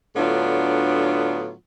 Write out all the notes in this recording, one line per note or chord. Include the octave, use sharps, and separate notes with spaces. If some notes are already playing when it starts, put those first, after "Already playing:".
A2 D3 F#3 B3 D4 F4